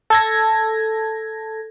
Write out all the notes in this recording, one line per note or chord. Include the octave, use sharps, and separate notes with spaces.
A4 G#6 A#6